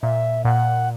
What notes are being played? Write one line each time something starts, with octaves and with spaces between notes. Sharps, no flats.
A#2 E5
A#2 F#5